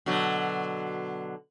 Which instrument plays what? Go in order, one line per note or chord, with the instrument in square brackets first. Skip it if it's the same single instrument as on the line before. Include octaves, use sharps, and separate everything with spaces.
[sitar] B2 D3 F#3